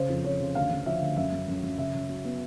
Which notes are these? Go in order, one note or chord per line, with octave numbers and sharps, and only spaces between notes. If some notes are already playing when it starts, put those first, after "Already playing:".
Already playing: C#3 C5
F2
F2 C#5
C#3
D2 F5
D3
F3 E5
D2
F#2 E5
F#2
F#2
F#2
C#3 E5
C#3
F#3
B3